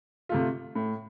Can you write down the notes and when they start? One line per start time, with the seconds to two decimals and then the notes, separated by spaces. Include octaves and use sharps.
0.29 C3 A3 F4
0.75 A2